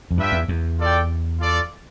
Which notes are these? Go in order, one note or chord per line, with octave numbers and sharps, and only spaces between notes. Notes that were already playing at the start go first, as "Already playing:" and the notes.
F2
G2 D4 F4 B4 E5 G5
E2
E2
F4 A4 D5 G5
F4 A4 D5